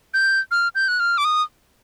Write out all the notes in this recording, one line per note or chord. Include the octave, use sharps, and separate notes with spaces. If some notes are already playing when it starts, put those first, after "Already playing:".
G6
F6
G6
F#6
F6
D6
D#6